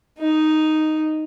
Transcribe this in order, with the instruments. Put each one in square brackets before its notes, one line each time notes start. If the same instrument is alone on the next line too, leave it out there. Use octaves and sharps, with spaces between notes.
[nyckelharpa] D#4